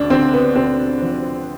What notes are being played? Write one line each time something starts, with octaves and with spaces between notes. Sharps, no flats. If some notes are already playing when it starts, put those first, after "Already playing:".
Already playing: D2 D4
D3 C4
B3
D2 C4
F3